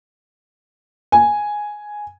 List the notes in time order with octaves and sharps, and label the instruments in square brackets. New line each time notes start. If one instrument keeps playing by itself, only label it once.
[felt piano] G#5